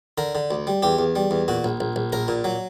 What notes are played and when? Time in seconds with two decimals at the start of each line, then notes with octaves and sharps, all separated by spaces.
0.18 D3 A#4
0.35 D3
0.51 D2
0.67 G3
0.83 E2 G4
0.99 E2
1.16 G3
1.31 E2
1.48 A#2 F#4
1.64 A#1
1.80 A#1
1.96 A#1
2.13 A#1 A#4
2.28 A#2
2.44 F#3